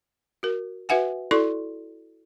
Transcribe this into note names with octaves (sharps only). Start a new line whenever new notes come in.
F#4 A#4
F#4 B4 E5 F#5 G#5
E4 F#4 A4 D5 C6 C#6